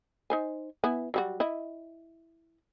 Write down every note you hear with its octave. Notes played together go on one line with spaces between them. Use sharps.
D#4 C5 G#5
B3 E4 G#5
F#3 G3 F#4
E4 D#5